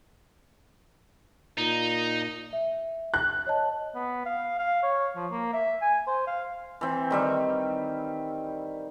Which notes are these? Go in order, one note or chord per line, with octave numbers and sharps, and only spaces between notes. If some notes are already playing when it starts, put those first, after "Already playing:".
A#2 D#4
E5
F#6
C#5 D#5 A5
B3
F5
F5
C#5
F3
A#3
E5
G#5
C5
F5
E3 C4
D#3 G3 E5